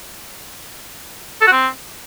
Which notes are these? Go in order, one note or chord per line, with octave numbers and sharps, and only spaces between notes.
A4
F#4
C4